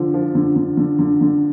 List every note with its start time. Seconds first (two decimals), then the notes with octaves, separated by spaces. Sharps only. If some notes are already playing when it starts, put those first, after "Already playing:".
Already playing: D3 F3
0.14 F3
0.35 D3
0.56 D3
0.77 D3
0.99 D3
1.21 D3